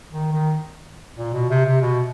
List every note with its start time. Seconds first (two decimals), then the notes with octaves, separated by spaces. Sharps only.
0.12 D#3
0.32 D#3
1.17 A#2
1.34 B2
1.50 C3
1.66 C3
1.81 B2